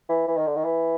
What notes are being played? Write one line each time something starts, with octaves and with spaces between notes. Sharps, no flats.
E3
E3
D#3
D3
D#3
E3